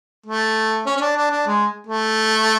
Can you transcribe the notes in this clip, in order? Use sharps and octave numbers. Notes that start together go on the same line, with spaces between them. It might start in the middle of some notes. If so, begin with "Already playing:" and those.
A3
C#4
C#4
D4
D4
D4
G#3
A3